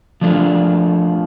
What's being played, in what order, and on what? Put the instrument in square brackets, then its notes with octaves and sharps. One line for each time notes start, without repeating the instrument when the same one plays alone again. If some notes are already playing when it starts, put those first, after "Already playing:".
[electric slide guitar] F3 A3 D4 F4